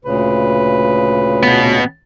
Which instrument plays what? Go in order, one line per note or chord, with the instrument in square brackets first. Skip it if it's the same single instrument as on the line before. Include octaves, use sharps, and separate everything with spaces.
[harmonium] D2 A#2 C#3 [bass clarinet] B4
[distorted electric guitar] B2 B3